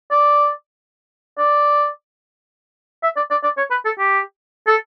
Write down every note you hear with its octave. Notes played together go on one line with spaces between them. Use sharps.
D5
D5
E5
D5
D5
D5
C#5
B4
A4
G4
A4